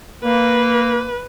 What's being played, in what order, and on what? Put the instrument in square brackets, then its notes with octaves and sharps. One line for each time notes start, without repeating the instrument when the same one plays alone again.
[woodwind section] A#3 [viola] B4